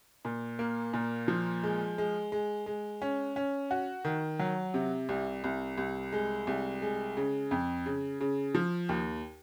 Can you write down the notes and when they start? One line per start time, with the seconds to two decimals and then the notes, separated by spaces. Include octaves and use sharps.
0.25 A#2
0.59 A#3
0.93 A#2
1.28 F3
1.63 G#3
1.98 G#3
2.32 G#3
2.66 G#3
3.02 C#4
3.36 C#4
3.71 F#4
4.05 D#3
4.39 F#3
4.74 C3
5.09 C2
5.44 C2
5.78 C2
6.13 G#3
6.47 C2
6.82 G#3
7.17 C#3
7.51 F2
7.86 C#3
8.20 C#3
8.55 F3
8.89 D#2